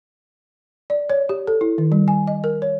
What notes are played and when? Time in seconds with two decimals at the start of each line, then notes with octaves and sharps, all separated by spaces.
0.90 D5
1.10 C#5
1.29 G4
1.47 A4
1.61 E4
1.78 D#3
1.92 G3
2.08 G#5
2.27 D#5
2.44 A#4
2.62 C#5